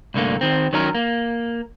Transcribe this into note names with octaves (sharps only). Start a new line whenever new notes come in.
C2 G2 D3 A3 A#3
D#3 C4
D#3 F#3 C#4 D#4 A#4
A#3